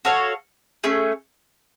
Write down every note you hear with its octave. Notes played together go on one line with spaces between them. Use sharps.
F#4 A4 C#5 F5
A3 C#4 G#4